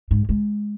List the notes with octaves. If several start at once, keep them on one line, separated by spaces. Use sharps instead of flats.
G#2
G#3